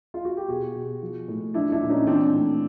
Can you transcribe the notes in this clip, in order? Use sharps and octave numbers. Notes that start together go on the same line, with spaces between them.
F4
F#4
G4
B2 F#4 G#4
B2
F3
A2
F3 D4 E4
D4 E4
A#2
C#4 D#4
E3 C4 D4
A2